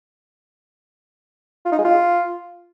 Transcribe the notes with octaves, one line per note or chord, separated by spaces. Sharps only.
F4
D#4
G#3
F4